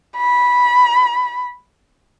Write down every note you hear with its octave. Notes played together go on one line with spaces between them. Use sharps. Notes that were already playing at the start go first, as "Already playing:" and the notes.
B5